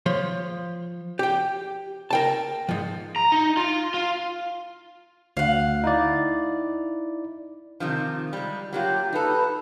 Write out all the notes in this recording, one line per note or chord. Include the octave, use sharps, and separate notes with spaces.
F3 C#5 C6
G4 G5
A#4 G5 A5
G#2 F3
A#5
D#4
F4
F4
D2 F5 F#5
D#4 E4 D5
C3 D#3 F3
G3 G#3
F#3 A#3 F4 G4
D#4 A4 B4